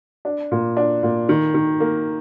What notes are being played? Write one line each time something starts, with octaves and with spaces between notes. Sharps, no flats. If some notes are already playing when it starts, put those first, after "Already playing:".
D4
A#2
D4
A#2
D#3
D#3
A#3